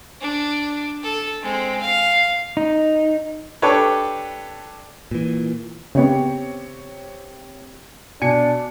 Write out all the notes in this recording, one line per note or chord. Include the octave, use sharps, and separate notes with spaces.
D4
A4
G#3 C4
F5
D#4
D4 G4 A4 B4 C#5
A#2 E3
C#3 B3 C4 G4 C#5
B2 D4 G#5 C#7